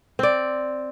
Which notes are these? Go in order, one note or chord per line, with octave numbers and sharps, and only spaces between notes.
C4 D5